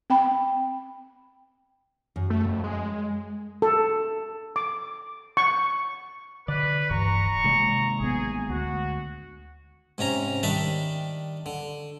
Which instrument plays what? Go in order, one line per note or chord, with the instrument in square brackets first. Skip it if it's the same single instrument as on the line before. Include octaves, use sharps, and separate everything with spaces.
[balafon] C4 G5 B5
[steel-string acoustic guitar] F#2
[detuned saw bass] A3
F2
G#3
[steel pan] A4
D6
C#6
[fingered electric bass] D3 [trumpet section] B4 [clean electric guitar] D5
[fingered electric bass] D1 G2 E3 [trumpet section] A#5 C#6
[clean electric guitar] D#2 G#3 [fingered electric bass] C3
[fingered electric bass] A1 B3 [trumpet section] G#4
[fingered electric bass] D2 [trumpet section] F#4
[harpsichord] G#2 C3 C#4 A#5
D#3 G3 D4 D5 E5
D3